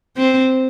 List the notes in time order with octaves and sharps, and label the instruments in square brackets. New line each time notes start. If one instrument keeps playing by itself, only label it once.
[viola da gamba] C4